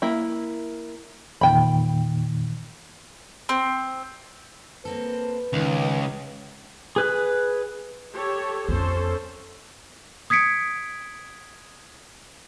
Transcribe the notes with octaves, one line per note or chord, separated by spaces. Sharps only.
A#3 E4
E2 A#2 D#3 G5 B5
C4
A#3 C4 A4 B4
C#2 D#3
G#4 B4 F#6
G4 A4 C#5
F2 B3 C#4 A4 C5
D#6 G#6 B6 C#7 D7